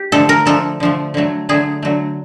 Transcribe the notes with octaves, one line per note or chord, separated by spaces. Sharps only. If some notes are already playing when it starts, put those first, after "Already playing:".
Already playing: G4
D3 F3 A3 A4
A#4
D3 F3 A3 A4
D3 F3 A3
D3 F#3 A3
D3 F#3 A3 G#4
D3 F#3 A3